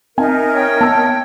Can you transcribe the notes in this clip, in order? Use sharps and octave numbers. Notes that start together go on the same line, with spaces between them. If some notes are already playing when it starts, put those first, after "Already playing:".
C4 D#4 A#4 E5 G#5
C#5 G5
B3 A5 E6